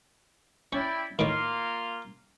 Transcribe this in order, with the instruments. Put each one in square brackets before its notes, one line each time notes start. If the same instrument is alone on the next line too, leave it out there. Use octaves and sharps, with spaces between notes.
[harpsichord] C#4 [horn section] E4 D5 G5
[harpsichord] A2 D#3 [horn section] A#3 F4 F5